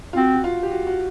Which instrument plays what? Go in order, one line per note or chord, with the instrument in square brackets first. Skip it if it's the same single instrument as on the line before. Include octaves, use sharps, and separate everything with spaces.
[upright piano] F4
[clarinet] C4 [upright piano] F#4
[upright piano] F#4
F4
G4
F#4
F#4